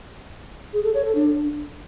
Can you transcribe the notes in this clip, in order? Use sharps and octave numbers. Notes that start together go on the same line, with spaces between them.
G#4
A4
C#5
A4
D4